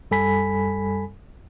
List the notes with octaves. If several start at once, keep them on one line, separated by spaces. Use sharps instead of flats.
F#2 G3 A4 G#5 B5 B6